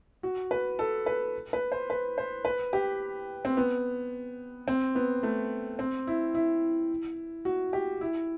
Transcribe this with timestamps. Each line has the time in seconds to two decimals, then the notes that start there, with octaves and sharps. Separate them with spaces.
0.23 F#4
0.51 B4
0.79 A4
1.06 B4
1.53 B4
1.72 C5
1.90 B4
2.18 C5
2.45 B4
2.73 G4
3.45 C4
3.57 B3
4.68 C4
4.95 B3
5.23 A3
5.79 C4
6.07 E4
6.35 E4
7.45 F#4
7.73 G4
8.01 E4